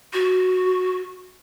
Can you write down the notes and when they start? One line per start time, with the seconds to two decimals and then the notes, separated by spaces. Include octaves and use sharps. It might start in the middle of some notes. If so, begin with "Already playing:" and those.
0.13 F#4